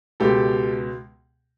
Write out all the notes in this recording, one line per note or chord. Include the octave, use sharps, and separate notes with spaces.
C#2 B2 G#3 G4 A4